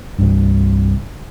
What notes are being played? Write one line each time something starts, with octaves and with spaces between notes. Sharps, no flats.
C2 G2